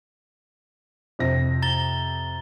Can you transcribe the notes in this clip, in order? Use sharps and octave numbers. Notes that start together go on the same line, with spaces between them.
F2 C3 A#6
A#5 A6 G7